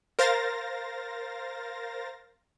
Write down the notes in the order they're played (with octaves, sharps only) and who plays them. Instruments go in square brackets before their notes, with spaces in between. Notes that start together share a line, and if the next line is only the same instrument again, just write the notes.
[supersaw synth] A#4 C5 F5 A6 A#6